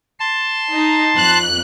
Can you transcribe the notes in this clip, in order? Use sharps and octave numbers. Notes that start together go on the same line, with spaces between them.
A5 C6
D#4
F2 F#6